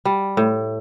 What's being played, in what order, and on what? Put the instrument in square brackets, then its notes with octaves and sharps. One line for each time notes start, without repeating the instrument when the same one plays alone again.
[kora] G3
A2